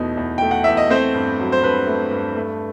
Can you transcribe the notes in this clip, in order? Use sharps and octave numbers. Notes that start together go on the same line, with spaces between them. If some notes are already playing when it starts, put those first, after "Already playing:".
Already playing: E2 B2 A3 D#4
E2
A3 G5
F#5
E2 E5
D#5
A3 C4 C5
G2
F#3
C5
G2 B4
A3
G2
A3